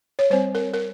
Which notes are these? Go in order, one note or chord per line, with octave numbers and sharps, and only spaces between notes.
C#5
G3 C4 C5
A#4
A#4